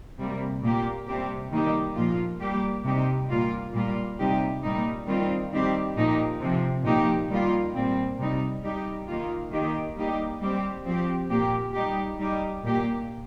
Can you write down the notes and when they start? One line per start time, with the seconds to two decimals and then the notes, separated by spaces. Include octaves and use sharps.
0.18 C3 G3 A#3
0.63 A#2 A#3 G4
1.07 C3 G3 C4 G4
1.52 D#3 G3 A#3 D#4 G4
1.96 A#2 F3 A#3 F4
2.40 G3 A#3 G4
2.84 C3 G3 D#4 G4
3.29 A#2 G3 A#3 F4
3.73 A#2 G3 A#3 F4
4.19 C3 G3 D#4 G4
4.63 A#2 G3 D#4
5.07 D#3 G3 C4 F4
5.52 D#3 G3 C4 G4
5.96 A#2 F3 A#3 D#4 G4
6.41 C3 F3 C4
6.84 A#2 F3 A#3 D#4 G4
7.30 D#3 G3 A#3 F4
7.74 A#2 G3 C4
8.18 C3 G3 D#4
8.62 G3 D#4 G4
9.07 D#3 A#3 F4
9.51 D#3 A#3 D#4 G4
9.96 G3 A#3 D#4 G4
10.41 G3 C4 G4
10.85 F3 C4 G4
11.30 A#2 A#3 G4
11.74 G3 D#4 G4
12.19 G3 D#4 G4
12.63 A#2 A#3 G4